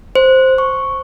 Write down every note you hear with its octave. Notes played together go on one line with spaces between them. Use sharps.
C5
C#6